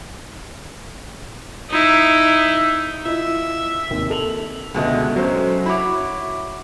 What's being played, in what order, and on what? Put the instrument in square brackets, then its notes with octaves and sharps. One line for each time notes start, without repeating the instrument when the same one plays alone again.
[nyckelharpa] D#4 E4
[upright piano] E4 F4 D#5 [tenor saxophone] E5
[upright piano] G#1 D#2
A4 F7 F#7
[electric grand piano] C#2 B2 D#5 [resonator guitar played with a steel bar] D3 G#3 A3
[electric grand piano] F#3 C#4 C5
[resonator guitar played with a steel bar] E4 F#4 C#5 [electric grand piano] B5 D6